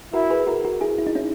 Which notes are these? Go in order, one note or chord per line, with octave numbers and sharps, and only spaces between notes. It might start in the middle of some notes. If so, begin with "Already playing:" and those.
E4 F#4 A#4
G#4 B4
F#4 A#4
F#4 A#4
E4 G#4
E4
D#4
C#4 E4